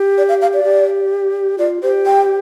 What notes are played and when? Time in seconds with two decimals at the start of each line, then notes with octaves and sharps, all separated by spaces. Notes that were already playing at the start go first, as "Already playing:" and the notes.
Already playing: G4
0.18 D5
0.29 F5
0.42 F5
0.53 D5
0.64 G4
1.58 F4 D5
1.82 G4 C5
2.06 G5